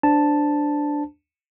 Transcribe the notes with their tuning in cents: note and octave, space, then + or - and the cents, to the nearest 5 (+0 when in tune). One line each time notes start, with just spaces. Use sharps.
D4 +0 C5 -10 A5 +0